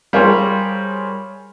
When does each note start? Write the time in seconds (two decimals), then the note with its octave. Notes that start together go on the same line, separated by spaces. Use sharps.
0.13 G3 F4 G#4 A#4 C5 C#5